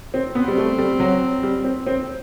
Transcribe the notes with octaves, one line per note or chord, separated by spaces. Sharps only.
C4
B3 C4
G3
A3
G3
F#3
G3
C4
C4